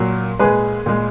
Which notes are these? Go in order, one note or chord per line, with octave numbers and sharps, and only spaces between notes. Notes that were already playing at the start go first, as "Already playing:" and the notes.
Already playing: A#2 F#3
A#2 G#3 G#4 B4
A#2 G#3